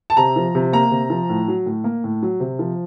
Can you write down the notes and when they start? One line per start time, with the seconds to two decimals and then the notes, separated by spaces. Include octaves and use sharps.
0.10 A5
0.17 C3 A#5
0.36 F3
0.55 C3
0.73 A#3 A#5
0.91 C3
1.10 F3
1.29 A2
1.48 F#3
1.66 A2
1.84 A#3
2.04 A2
2.23 F#3
2.40 C3
2.59 F3